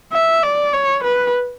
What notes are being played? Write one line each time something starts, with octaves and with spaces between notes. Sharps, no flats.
E5
D5
C#5
B4